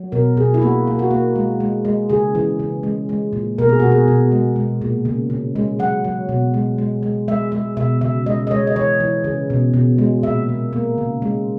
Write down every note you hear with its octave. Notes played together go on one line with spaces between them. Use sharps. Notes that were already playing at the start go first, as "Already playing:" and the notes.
Already playing: F#3
B2 A#4
B2 G#4
E4
A#3 F#4
A#3
F#4
A#3
G#3
G#3
G#3
C#3 G#4
E3
C#3
G#3
G#3
A#2
B2 A#4
G#4
B2 F#4
G#4
B2
G#3
G#3
A#2
C#3
C#3
G#3
F#3 F#5
F#3
B2
G#3
G#3
G#3
G#3 E5
G#3 E5
B2 E5
C#3 E5
G#3 D#5
D#5
G#3 C#5
D#5
E3 C#5
E3
C#3
B2
B2
G#3
A#2 E5
A#3
A#3
C#3
G#3